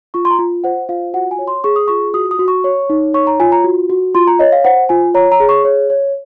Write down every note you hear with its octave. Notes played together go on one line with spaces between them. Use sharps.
F4 C#6
C6
A#5
F4
C5 F#5
F4 F5
F#4 F#5
G#5
C#5
C6
G#4 C#6
D#6
F4 C#6
F#4 D#6
D#6
F#4
C#6
C#5
D#4
C#5 C#6
A#5
F4 G#5
A#5
F#4
F#4
F4 C6
A#5
C#5 D#5
F5
C5 F#5
F4 G#5
C#5 A#5
A#5
G#4
C#6
C#5
C#5